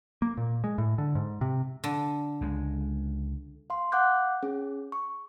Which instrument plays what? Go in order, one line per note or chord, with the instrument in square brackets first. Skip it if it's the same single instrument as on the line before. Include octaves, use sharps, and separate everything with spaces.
[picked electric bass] A#3
A#2
G#3
A2
D3
G#2
C3
[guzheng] D3
[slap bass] C#2 G#3
[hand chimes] F5 C6
F5 F#5 D6 F#6 G6
C#4 G#4
C#6